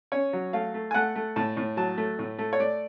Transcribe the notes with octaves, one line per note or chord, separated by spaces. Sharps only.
C#4 C#5
F#3
A3 F5
A3
G#5
A3 F#5
A3
A2 A5
A2
F#3 A5
A3
A2
A3
C#5
A3 D5